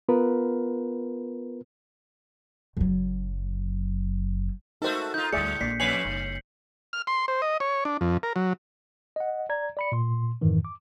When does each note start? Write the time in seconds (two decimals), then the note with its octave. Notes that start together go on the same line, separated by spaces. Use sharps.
0.09 B3 F4 A#4 B4
2.77 F#1 F#3
4.82 A3 D#4 F#4 A4 A#4 C5
5.14 D#4 F4 G6
5.33 D2 G#2 G3 G#4 D5 E5 C#7
5.61 A#1 D5 B6 C7
5.80 F2 B4 C#5 G#5 C7 C#7 F#7
6.05 F#1 G2
6.93 F6
7.07 C6
7.28 C5
7.42 D#5
7.60 C#5
7.85 D4
8.01 F2
8.23 A#4
8.36 F#3
9.16 D#5 F#5
9.49 D5 A#5 G#6
9.77 D5 B5 C#7
9.92 A#2 C6
10.41 F2 G#2 D#3 E3
10.65 D6